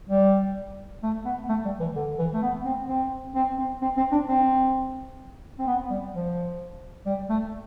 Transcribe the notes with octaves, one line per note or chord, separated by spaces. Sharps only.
G3
A3
B3
A3
G3
E3
D3
E3
A3
B3
C4
C4
C4
C4
C4
C4
D4
C4
C4
B3
G3
F3
G3
A3